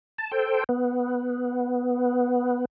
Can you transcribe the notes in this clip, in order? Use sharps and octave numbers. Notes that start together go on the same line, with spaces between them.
A5
A4 C5 G5
B3